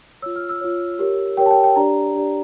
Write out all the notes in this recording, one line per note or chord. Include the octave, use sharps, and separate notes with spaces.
F4 C#5 E6
F6
E6
F4 C#5
G4 A#4 C#5
G4 A#4 C#5 G5
A5
G5
G5
D4 G4 D5 A#5
D4 G4 D5